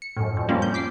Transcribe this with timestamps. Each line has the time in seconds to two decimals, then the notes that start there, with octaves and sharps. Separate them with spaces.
0.02 C#7
0.17 F#2 A2
0.37 F2
0.49 F3 G3 A#3 C#4 F4
0.62 G6
0.74 D6 B6 C7